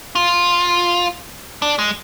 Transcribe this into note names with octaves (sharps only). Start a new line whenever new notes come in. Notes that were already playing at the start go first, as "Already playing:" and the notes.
F4
D4
G#3